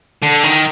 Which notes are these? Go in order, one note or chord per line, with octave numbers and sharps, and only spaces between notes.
D3
D#3